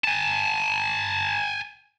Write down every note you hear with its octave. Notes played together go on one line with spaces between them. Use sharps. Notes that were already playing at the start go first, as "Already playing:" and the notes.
G#5 A5